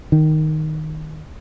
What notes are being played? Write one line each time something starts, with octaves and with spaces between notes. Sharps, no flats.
D#3